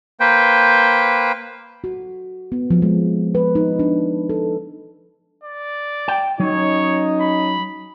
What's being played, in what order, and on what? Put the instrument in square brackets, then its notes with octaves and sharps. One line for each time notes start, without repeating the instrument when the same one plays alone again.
[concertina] A#3 B4 C5 G5
[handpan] F#4
B3
F3
G#3
B4
D#4
D4
A4
[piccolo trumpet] D5
[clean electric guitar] G5
[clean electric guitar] F#3 [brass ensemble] C#4 D#4 D#5 [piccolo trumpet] C#5
[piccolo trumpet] B5